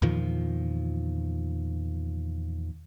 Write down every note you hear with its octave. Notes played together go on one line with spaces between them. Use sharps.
E2 A#2 D#3 F3